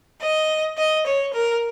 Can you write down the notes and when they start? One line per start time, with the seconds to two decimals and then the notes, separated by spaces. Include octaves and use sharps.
0.21 D#5
0.77 D#5
1.06 C#5
1.33 A#4